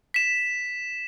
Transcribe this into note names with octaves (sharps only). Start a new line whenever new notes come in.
B6 E7